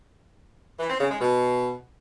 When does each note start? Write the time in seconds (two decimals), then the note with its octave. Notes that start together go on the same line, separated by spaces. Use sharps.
0.80 E3
0.90 C4
1.00 C#3
1.11 G#3
1.21 B2